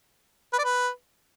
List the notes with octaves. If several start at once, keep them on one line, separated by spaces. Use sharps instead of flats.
B4
D5
B4